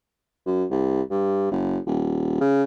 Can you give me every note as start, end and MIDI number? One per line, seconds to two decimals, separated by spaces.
0.46 0.65 42
0.71 1.02 36
1.11 1.48 43
1.52 1.78 30
1.86 2.39 27
2.41 2.64 49